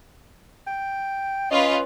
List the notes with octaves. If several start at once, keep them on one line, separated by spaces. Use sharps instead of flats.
G5
C#4 F4 B4 D#5